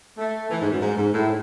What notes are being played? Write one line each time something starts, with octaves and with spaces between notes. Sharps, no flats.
A3
E3
G#2
F#2
G#2
G#2
A2